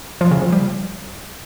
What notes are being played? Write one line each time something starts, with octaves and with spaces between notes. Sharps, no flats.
F3
C#3
F3
G3